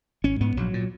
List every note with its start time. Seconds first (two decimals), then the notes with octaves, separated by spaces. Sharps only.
0.24 G#1 C#4
0.41 G#2 B3
0.57 A#1 F#3
0.74 A#2